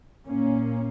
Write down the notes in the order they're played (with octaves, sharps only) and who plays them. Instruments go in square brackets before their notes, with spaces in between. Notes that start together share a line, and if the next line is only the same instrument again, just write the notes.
[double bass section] A#2 A#3 C#4